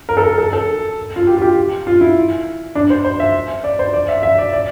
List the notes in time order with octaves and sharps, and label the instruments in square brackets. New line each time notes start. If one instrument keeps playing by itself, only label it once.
[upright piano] A#4
A4
A#4
A4
A4
F4
G4
F4
G4
F4
E4
D4
C5
C5
E5
D5
C5
D5
E5
E5
D5
D5